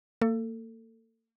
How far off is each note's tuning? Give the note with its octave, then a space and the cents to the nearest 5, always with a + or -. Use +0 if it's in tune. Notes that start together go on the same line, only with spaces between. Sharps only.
A#3 -35 A4 +25